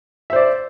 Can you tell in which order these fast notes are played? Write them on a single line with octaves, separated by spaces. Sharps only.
E5 C5 D5